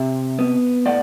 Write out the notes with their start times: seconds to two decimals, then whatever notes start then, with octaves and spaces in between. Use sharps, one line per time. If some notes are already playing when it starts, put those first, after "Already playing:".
Already playing: C3 C5 E5
0.39 B3
0.86 A2 D5 F#5